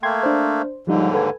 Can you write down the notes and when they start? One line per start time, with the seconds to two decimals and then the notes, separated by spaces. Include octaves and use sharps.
0.03 A3 A#3 G5 C6 G#6
0.23 D4 C5
0.87 D#2 G#2 D3 F3 G3 D#4
1.14 A4 B4 G#5